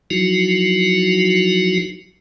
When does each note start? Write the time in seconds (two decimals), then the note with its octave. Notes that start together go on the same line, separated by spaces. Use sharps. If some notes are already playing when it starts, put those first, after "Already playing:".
0.10 F3 F#3 D#4 E4 F#4